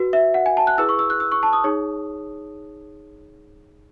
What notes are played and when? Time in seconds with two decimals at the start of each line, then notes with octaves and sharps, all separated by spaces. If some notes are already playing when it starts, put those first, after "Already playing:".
Already playing: F#4 B4
0.13 E5
0.34 F#5
0.46 G#5
0.57 A5
0.67 F#6
0.78 E4 G#4 B4 E6
0.89 C#6
0.99 E6
1.10 F#6
1.20 E6
1.32 C#6
1.43 A5
1.53 D#6
1.64 D#4 G#4 C#5